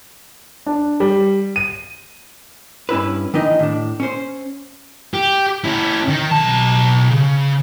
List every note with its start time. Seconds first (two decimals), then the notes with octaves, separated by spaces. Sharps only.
0.66 D4
1.00 G3
1.56 D#7
2.89 G2 C#4 E4 B4
3.34 D#3 E3 D4 D#4 D#5
3.59 A2 D4
4.00 C#4 C5
5.14 G4
5.64 C#4 E4
6.08 D#3 D#4
6.31 B1 A5
7.10 C#3